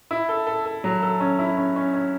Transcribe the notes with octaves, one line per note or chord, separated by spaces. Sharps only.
E4
A4
A4
A4
F#3
A4
C#4
E4
C#4
C#4
C#4